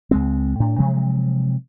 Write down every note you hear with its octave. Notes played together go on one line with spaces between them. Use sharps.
C#2 G#3 C4
A2 D4
C3 F3 F#3 G#3